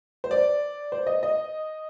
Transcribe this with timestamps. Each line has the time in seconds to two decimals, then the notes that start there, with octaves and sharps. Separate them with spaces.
0.24 C5
0.31 D5
0.92 C5
1.07 D#5
1.23 D#5